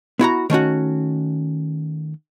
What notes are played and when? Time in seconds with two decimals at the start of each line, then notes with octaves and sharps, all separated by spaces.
0.19 B3 E4 F#4 A#5
0.50 D#3 A3 C#4 F#4